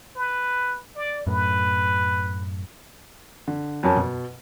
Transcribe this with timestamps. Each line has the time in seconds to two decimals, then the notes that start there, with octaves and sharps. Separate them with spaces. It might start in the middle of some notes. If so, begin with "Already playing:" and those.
0.16 B4
0.96 D5
1.27 F#2 A2 B4
3.48 D3
3.83 F2 F#3 C#4 A#4 G#5 A5
3.97 B2